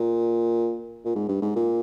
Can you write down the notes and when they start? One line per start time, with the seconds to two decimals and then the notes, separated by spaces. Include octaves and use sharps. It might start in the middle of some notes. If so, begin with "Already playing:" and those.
Already playing: A#2
1.05 A#2
1.15 G#2
1.29 G2
1.42 G#2
1.56 A#2